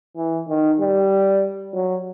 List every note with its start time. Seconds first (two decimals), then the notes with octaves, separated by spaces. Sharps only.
0.17 E3
0.49 D#3
0.80 G3
1.74 F#3